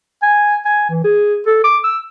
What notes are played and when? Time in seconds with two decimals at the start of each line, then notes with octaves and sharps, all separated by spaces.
0.22 G#5
0.65 G#5
0.89 E3
1.04 G#4
1.46 A4
1.64 D6
1.84 E6